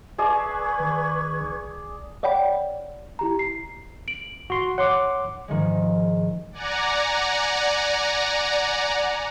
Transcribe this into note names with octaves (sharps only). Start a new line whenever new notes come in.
G#4 B4 D5 A5 C#6 G#6
D#3
C2
C#5 D5 F#5 G5 B5
E4 G4 A#5
C7
D7 F#7
F#4 C6
C#5 F#5 C6 D6
G#2 D#3 F3 G#3
D5 F#5 G#5 A#5